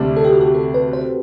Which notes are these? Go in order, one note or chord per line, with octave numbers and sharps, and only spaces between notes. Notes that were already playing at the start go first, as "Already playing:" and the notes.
Already playing: D2 C3 G3 C4 D4
A4
G4
F#4
G4
A4
B4
C5